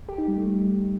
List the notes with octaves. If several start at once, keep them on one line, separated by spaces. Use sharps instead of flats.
G4
D#4
G3
A3
G3